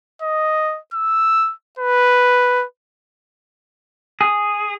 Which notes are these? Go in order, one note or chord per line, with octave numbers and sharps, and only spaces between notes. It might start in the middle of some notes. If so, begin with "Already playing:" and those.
D#5
E6
B4
G#4